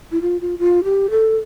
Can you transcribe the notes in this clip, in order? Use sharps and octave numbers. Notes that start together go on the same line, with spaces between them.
E4
F4
F4
F4
G4
A4